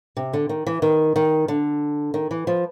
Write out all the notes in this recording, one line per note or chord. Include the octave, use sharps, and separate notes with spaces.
C3
D3
D#3
E3
D#3
D#3
D3
D#3
E3
F3